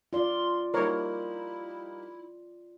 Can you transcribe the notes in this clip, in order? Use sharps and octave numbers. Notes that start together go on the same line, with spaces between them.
F4 D5 C6
G3 A#3 D#4 E4 A#4 C#5